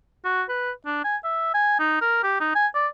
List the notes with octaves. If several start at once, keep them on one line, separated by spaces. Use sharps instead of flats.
F#4
B4
D4
G#5
E5
G#5
D#4
A#4
G4
D#4
G#5
D5